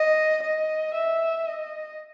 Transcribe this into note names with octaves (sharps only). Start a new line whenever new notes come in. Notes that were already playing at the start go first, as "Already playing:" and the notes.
Already playing: D#5
D#5
E5
D#5